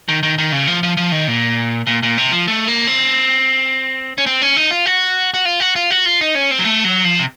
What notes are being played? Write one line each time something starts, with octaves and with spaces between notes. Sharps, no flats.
D#3
D#3
D#3
C#3
F3
F3
F3
D#3
A#2
A#2
A#2
C3
F3
A3
A#3
C4
C#4
C4
C#4
D#4
F4
F#4
F#4
F4
F#4
F4
F#4
F4
D#4
C#4
C4
F#3
A3
F#3
F3
C3